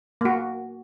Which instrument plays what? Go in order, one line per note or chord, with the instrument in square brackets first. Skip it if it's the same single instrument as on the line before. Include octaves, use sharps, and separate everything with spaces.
[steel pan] A#3 F#4